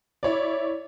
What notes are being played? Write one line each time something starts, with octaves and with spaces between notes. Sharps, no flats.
E4 C#5 D5